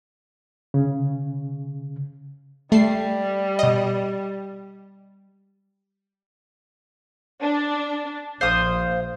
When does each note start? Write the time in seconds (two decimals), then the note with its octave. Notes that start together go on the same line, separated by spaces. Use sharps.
0.74 C#3
2.72 G3 A3 C7
3.59 B2 D#5
7.42 D4
8.41 A#1 C5 F5 D#6